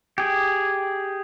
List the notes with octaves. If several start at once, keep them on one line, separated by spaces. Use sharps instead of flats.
G4 G#4